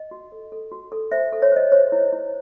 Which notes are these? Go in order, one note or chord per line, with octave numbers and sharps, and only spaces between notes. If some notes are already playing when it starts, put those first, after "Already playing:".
Already playing: D#5
F#4
A4
A4
F#4
A4
C5 E5
A4
C#5
C5 D#5
C5 C#5
E4
E4